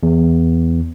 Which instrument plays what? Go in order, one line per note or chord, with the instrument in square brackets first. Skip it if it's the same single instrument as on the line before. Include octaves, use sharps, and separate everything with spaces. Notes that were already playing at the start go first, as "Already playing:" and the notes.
[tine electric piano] E2